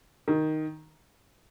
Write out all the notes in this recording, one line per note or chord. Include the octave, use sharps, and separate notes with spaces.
D#3